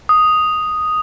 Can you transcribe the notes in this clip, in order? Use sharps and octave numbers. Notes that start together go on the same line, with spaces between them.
D#6